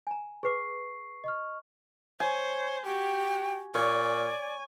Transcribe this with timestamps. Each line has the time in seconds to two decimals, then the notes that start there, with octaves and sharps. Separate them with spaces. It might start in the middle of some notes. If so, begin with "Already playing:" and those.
0.07 G#5 A#5
0.43 G#4 B4 C#6 D6 C7
1.24 D#5 C#6 F6
2.20 C5 C#5 G#5
2.84 F#4 G4 G5
3.75 A#2 C#5 D5 G#5